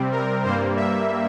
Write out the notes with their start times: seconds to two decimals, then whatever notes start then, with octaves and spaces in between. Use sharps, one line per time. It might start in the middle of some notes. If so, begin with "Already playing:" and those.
Already playing: C3 G3 C4
0.12 A#4
0.43 G2 G3 A#3 C5
0.76 E5